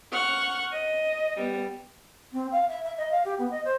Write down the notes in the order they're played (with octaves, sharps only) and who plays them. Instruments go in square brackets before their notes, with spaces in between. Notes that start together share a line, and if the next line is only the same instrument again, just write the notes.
[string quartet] F#5 C#6 F6
D#5
G3 B3
[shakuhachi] C4
F5
E5
E5
D#5
F5
G4
B3
D#5
C5